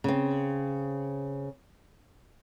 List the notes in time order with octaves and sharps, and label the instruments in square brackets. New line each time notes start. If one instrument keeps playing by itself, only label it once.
[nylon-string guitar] C#3 C4